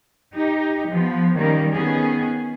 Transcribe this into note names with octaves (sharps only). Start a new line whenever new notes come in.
D#4 G4
F3 B3
D#3 G3 A#3 C#4 A#4
D#3 B3 C#4 G#4